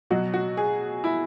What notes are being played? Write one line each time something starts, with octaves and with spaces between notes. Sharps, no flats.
B2 F#3 F#4
F#4
G#4
E4